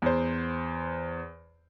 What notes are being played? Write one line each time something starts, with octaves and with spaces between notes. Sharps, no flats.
E2 C5